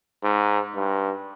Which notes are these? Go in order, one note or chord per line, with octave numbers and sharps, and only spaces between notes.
G#2
G2